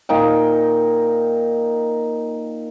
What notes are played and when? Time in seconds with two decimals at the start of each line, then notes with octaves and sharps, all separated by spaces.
0.09 A#2 D#4 G5